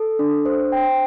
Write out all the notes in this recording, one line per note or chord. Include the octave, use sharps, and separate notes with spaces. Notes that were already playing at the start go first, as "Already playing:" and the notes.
Already playing: A4
D4
C5
G5